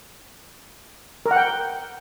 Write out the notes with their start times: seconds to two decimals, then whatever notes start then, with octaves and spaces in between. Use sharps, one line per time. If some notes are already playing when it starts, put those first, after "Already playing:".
1.26 A#4
1.31 F#5
1.36 G5